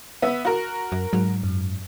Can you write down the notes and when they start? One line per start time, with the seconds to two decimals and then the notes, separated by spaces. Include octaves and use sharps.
0.22 B3 E5
0.45 F#4 A#4
0.92 F#2
1.13 G#2 F#3
1.43 F#2